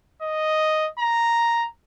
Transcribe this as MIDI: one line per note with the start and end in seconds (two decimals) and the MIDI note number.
0.22 0.88 75
0.99 1.67 82